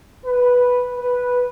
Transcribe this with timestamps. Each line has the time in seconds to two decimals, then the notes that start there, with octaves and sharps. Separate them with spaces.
0.24 B4
0.99 B4